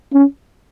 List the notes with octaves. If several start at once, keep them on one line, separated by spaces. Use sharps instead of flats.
C#4